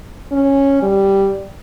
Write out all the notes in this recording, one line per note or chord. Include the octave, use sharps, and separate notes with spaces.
C#4
G3